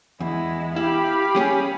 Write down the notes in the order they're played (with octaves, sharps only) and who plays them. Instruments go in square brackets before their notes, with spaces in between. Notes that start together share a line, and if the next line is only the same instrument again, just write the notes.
[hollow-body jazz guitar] E2 [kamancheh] G#3 E4
[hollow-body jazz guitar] E4 [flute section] G4 [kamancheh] F5 B5
[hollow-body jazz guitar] G3 C#4 G#4